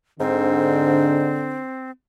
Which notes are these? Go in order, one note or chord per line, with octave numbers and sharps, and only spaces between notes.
G#2 D3 C4